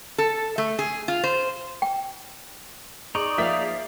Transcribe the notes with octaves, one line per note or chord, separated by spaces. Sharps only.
A4
A3
G#4
F4
C5
G5
D#4 G#4 D5 C#6
F3 A#3 E5 F5 B6